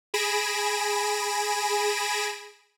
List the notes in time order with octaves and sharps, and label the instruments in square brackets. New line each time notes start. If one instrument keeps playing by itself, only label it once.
[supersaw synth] G#4 G#5 B5 A#6 D7 E7